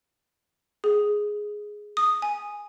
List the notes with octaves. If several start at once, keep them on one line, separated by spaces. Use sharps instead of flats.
G#4
D#6
G#5